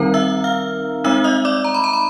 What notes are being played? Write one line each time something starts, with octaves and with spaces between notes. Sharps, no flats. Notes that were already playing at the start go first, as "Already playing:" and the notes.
Already playing: D#3 G3 C4 D#4 A#4 A#5
E5 E6
F5 F6
G#3 C4 D#4 E5 E6
D#5 D#6
D5 D6
A#5
B5
A#5
B5